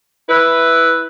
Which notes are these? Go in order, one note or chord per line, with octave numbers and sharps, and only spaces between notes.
E4 B4